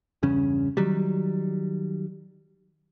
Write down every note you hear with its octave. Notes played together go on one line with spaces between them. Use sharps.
E2 G2 C#3 C#4
D#3 F#3 G3